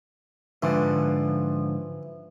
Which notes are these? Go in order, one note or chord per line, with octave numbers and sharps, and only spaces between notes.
G#2 D3 E3 F3